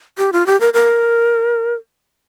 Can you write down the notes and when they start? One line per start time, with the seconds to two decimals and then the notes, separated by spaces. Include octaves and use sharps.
0.18 G4
0.33 F4
0.46 G4
0.60 A#4
0.74 A#4